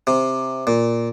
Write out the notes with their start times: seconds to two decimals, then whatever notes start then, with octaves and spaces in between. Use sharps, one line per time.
0.07 C3
0.67 A#2